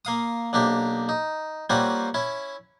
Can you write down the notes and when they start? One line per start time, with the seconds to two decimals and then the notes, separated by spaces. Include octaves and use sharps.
0.05 A#3 F5 D#6
0.53 B1 A#3 D4 G4
1.09 D#4
1.70 G3 A#3 C4 C#4 F4 F#4
2.14 C#4 E4